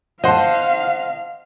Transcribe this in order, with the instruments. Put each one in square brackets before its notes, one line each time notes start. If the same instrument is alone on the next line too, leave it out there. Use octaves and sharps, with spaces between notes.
[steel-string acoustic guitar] C5 A5 [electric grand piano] D#5 F#5 C6 [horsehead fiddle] F5